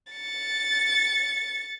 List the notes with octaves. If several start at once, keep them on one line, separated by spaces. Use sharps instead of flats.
A6 C#7